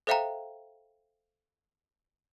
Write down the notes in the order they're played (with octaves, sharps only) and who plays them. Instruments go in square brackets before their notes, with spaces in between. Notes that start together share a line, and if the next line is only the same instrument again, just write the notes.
[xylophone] A4 C5 E5 F5 G5 A#5